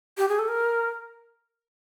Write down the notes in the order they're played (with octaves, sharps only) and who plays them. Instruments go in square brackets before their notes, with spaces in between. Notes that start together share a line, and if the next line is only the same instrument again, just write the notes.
[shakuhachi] G4
G#4
A4
A#4